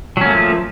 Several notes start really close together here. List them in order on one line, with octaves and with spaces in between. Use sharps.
F#3 C#4 A#3 A3 F3